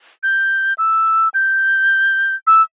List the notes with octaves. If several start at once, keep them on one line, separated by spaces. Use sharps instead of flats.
G6
E6
G6
E6